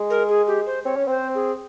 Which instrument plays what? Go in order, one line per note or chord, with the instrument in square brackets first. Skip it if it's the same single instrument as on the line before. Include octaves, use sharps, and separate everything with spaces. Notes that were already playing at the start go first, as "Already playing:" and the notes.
Already playing: [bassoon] G#3
[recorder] A#4
G#4
G4
C5
[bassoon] C4 [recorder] C#5
[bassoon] C#4
[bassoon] C4 [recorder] C5
[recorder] G#4